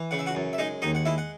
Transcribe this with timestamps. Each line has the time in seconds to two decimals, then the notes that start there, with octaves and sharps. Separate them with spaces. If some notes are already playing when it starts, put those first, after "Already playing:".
Already playing: E3
0.11 C#3 F#5
0.19 E5
0.26 F#4 F#5
0.35 F#2
0.53 E5
0.58 G#3 D#4 D#5
0.82 D#2 D#4 D#5
0.95 F#5
1.05 G#3 E4 E5
1.18 F#5